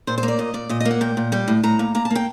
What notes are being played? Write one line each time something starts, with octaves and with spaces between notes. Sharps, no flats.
A#2 C5
C5
A#3
D5
A#2 D#5
A#2 D5
A#2 D#5
D#5
A#3
F#5
A#2 G5
A#2
G3 G5
A2
A2 A#5
A#3
A#3 A#5
A5
A#3 G5